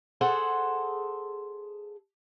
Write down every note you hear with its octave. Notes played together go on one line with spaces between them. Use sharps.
G#4 A4 C5 F#5